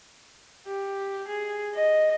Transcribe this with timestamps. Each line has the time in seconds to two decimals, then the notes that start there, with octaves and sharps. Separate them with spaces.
0.67 G4
1.28 G#4
1.74 D#5